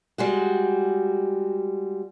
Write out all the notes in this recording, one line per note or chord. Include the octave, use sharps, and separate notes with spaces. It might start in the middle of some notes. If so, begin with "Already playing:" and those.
G3 G#3 F#4